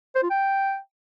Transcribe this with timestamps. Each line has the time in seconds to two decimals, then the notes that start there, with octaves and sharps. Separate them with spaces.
0.15 C5
0.23 F4
0.30 G5